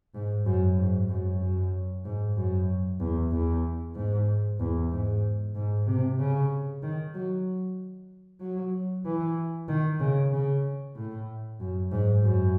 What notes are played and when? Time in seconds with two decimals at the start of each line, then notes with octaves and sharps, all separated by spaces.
0.14 G#2
0.46 F#2
0.78 G#2
1.09 F#2
1.41 F#2
2.05 G#2
2.36 F#2
2.99 E2
3.31 E2
3.95 G#2
4.59 E2
4.91 G#2
5.55 G#2
5.87 C3
6.19 C#3
6.82 D#3
7.14 F#3
8.41 F#3
9.05 E3
9.68 D#3
10.00 C#3
10.33 C#3
10.96 A2
11.60 F#2
11.91 G#2
12.22 F#2